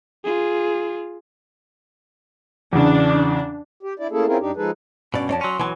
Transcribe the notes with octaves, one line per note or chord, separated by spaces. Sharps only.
F4 G#4
E2 C#3 D4
G4
D4 E4 D5
A3 A#3 C#4 E4 G#4 A4
C4 C#4 E4 F4 G#4 A#4
F#2 D4 D#4 G4
F3 G#3 D#4 G#4 A4 B4
G2 B2 C#4 D5
F2 G#2 C#5 D5 A5
F#3 C#4 C6
B1 E3 F#3 G#5